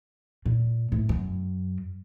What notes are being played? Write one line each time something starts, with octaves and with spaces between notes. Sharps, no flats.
A#2
A2
F#2